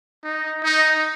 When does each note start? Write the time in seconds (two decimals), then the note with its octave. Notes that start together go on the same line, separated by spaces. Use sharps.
0.23 D#4
0.63 D#4